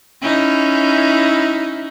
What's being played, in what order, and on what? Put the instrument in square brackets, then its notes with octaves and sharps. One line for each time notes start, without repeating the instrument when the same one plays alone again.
[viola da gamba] C#4 D#4 E4